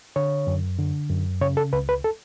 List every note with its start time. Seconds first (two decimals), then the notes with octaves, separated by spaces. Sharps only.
0.16 D3 C#5
0.47 F#2
0.79 D3
1.10 F#2
1.41 C#3 C#5
1.57 A4
1.73 C#2 B4
1.89 B4
2.04 A4